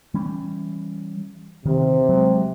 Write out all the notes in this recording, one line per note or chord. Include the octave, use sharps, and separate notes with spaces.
E3 G3 C#4
C3 D#3
F#3 G#3